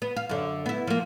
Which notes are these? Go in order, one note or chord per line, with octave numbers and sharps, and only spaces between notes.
B3
F5
F#2 D3
B3 E4
F3 A#3